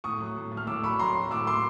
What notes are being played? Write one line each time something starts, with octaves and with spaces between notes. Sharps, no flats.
A2 C#6 D#6
F#3
A2
A2
F6
A2 D6 E6
F#3 B5 C#6
F#3 A#5 C6
F#3
A2 D6 E6
A2 C6 D6